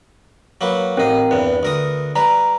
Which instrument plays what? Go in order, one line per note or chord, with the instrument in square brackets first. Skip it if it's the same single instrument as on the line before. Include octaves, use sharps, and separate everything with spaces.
[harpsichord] F#3 A#3 B4
[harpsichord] A1 D#4 [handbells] C4 A#4 F5
[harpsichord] E2 G2 [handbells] B4
[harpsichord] D2 A#4 D#6
[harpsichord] G3 B4 [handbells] A#5